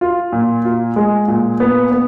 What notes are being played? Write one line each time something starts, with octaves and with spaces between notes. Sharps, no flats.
F4
A#2
F4
G#3
A#2
B3
B3